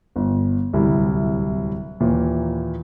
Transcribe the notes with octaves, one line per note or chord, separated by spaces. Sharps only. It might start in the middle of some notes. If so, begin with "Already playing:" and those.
G1
D1 C2 G3 E4
D#2 A#2 E3